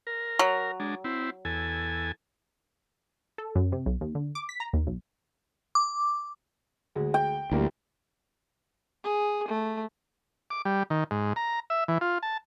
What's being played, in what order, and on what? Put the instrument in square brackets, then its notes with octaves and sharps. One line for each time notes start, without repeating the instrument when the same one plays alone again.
[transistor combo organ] A#4
[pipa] F#3
[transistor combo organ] G#3 D4
C4 E4
E2 A4 G#5
[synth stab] A4
F#2
C3
B1
D#2
D3
D6
B6
A#5
D#2
B1
[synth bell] D6
[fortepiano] D2 G#3
[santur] G5
[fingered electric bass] D2 [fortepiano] G3 A#3 E4
[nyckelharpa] G#4
A3
[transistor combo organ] D6
G3
D#3
G#2
A#5
E5
E3
F4
A5